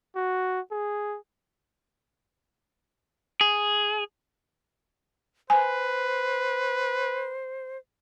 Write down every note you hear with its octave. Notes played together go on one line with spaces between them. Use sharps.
F#4
G#4
G#4
B4 C5 G#5